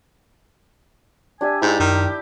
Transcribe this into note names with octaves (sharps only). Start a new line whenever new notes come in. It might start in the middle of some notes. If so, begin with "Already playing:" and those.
D4 G4 E5 G#5
G#2 E4 G4
F#2 D#3 A#5